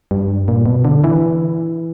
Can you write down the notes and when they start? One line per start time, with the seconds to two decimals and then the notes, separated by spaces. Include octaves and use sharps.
0.11 G2
0.48 A#2
0.66 B2
0.85 D3
1.04 E3